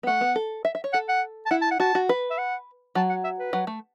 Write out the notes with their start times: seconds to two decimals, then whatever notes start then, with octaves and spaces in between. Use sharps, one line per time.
0.03 B3
0.07 A3 F#5
0.21 B3
0.36 A4
0.65 E5
0.75 E5
0.84 C#5
0.93 A4 F#5
1.09 F#5
1.46 A5
1.51 E4 F#5
1.62 A5
1.71 F#5
1.80 F#4 A5
1.95 F#4
2.09 B4
2.31 E5
2.38 F#5
2.95 F#3 A5
3.10 F#5
3.24 E5
3.39 B4
3.53 F#3
3.67 A3